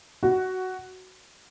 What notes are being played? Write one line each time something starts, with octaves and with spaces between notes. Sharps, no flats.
F#4